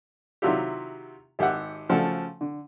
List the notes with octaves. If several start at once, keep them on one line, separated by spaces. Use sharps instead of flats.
C3 D#3 F#3 E4 F4 G4
G#1 G4 E5 F#5
C#3 F3 A3 F#4 A4
D3